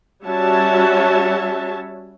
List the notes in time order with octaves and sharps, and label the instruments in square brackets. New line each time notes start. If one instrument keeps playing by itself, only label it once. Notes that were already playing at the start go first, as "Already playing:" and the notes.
[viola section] G3 C#4 F#4 C#5 E5 A5